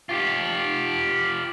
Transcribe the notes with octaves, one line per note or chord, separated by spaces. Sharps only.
F4 G4